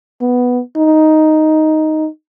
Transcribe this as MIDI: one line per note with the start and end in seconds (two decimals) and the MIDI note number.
0.21 0.60 59
0.76 2.08 63